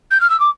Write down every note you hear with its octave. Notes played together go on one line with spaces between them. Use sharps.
G6
F6
E6
D6